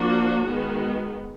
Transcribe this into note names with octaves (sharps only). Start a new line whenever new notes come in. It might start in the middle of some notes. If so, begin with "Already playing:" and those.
Already playing: F3 A#3 D4 F#4
D#3 G#3 B3